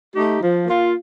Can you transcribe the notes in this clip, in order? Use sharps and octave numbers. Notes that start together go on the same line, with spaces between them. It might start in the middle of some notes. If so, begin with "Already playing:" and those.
A3 D#4 G4
F3
A#3 F4